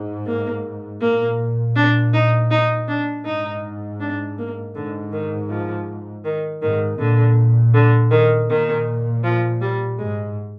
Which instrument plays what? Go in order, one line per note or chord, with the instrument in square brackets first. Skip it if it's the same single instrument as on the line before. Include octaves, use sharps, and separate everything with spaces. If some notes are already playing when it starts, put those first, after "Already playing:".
Already playing: [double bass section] G#2
[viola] A#3
[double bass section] A#2 [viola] A#3
[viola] D4
D#4
D#4
D4
[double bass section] G#2 [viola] D#4
[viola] D4
A#3
[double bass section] G#2 [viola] D3
[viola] D#3
F3
D#3
[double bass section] G#2 [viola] D#3
[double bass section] A#2 [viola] D3
[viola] D3
D#3
[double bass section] A#2 [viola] D#3
[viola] F3
G3
[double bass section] G#2 [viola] G#3